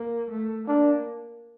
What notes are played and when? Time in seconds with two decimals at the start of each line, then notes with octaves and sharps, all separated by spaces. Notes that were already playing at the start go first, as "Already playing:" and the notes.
Already playing: A#3
0.30 A3
0.68 A#3 D4